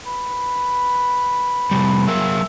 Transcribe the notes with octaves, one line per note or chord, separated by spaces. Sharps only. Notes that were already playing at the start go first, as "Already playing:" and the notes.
B4
F2 C3 G3
F#3 G#4 A#4 E5